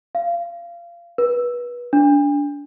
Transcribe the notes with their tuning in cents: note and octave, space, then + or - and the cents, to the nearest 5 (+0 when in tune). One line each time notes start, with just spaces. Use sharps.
F5 -25
B4 -25
D4 -20